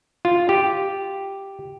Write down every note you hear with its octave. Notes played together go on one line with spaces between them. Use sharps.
F4
G4